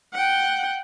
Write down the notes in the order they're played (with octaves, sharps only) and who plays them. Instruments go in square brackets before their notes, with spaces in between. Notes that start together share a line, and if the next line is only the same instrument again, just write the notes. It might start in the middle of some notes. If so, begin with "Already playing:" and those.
[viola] F#5 G5